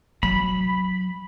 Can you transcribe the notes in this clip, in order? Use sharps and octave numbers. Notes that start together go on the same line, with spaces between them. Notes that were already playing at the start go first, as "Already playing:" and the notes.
F#3 B5